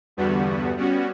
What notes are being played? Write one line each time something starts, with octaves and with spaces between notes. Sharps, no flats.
E2 G2 D3 G3 B3 F#4
G3 B3 C#4 F#4